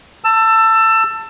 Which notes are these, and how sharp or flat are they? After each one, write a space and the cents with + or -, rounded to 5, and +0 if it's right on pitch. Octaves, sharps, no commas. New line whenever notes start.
A5 +20 E6 +20